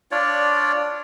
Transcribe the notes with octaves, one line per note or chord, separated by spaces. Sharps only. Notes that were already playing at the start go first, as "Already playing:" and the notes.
D4 F4 C#5 D5